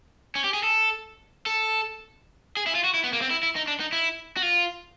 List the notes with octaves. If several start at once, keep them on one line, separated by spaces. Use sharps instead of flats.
C#4
G4
G#4
A4
A4
G#4
E4
F4
F#4
E4
B3
A#3
C4
E4
E4
D#4
D4
D#4
E4
F#4
F4